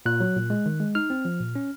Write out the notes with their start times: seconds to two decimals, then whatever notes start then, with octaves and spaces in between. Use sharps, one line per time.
0.06 A#2 F#6
0.20 F#3
0.36 A#2
0.50 G#3
0.66 D#3
0.80 G#3
0.95 D#4 F6
1.10 C4
1.25 F3
1.40 A#2
1.55 C#4